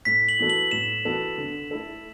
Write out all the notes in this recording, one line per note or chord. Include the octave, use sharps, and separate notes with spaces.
A2 B6
F#7
E3 B3 F#4 A4
F#7
A2 E7
E3 B3 F#4 A4
D3
A3 E4 A4